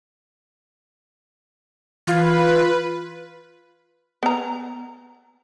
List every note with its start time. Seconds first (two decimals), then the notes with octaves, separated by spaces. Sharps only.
2.07 E3 F4 B4 F5 G#6
4.23 B3 A#5